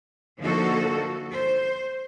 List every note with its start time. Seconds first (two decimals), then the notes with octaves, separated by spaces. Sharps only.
0.39 D3 F3 A#3 D#4 F#4 A4
1.32 C5